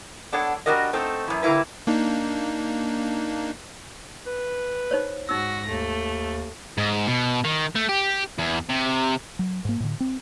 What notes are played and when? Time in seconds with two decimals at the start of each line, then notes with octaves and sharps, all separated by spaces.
0.32 B3 D4 A4 C#5 F#5
0.66 G3 A#3 D4 F#4 A#4 D#5
0.93 A3 C4 D#4 A4
1.27 F#2 E3
1.43 D3 G3 A#3 E4 B4
1.87 A#3 D4 D#4
4.26 B4
4.91 D#4 C5 C#5
5.29 G#2 D#4 F#4 E6 A#6
5.68 D#2 A3
6.78 G#2
7.07 B2
7.45 D#3
7.76 A3
7.89 G4
8.38 E2
8.69 C3
9.39 F#3
9.65 G#2 A#3
9.80 A2 D3
10.00 C4